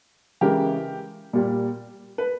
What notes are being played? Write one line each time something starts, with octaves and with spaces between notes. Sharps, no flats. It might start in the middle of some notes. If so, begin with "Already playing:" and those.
C#3 E3 G#3 G4 A#4
A#2 G3
B4